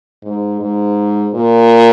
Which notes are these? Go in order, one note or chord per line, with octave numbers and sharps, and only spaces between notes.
G#2
G#2
A#2